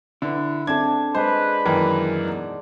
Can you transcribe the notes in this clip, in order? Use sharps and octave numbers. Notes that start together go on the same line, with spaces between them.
D3 E4 B4
C4 D4 A4 E5 G#6
G#3 B4 C5
F#2 D#3 E3 A#3 G5
G#2 B2